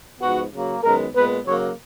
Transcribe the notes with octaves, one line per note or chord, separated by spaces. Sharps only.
G#2 F3 B3 F#4
C#3 F#3 A#3
F#2 D#3 G#3 B3 A#4
A#2 G#3 B3 B4
C#3 F#3 A#3 C#5